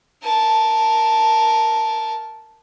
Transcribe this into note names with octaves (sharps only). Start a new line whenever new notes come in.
A#4 A5